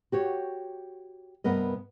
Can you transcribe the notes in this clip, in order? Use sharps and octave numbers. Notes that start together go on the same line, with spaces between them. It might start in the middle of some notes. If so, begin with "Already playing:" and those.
F#4 G4 C#5
G2 C3 B3 A#4 D#5